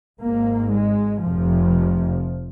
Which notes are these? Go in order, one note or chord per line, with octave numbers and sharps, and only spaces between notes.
G#1 G#2 A#3
G#3
F1 F2 C3 F3